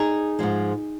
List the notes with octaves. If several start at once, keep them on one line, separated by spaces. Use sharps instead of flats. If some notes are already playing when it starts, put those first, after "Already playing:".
Already playing: D#4 G#4
G#2 F3 G#3